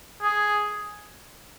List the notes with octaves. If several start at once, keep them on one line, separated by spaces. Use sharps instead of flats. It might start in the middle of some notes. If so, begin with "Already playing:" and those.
G#4